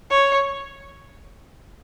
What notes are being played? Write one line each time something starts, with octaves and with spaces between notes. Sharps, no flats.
C#5